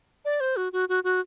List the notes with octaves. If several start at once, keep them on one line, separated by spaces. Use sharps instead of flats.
D5
C5
F#4
F#4
F#4
F#4